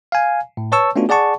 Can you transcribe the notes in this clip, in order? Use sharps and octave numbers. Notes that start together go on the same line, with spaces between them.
F5 G#5
A2
B4 C#5 A5 C#6 E6
A3 B3 C#4 D4 F4 F#4
G#4 D5 F#5 A5 C#6